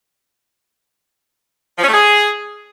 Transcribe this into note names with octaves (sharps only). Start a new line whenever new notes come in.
F3
C#4
A3
G#4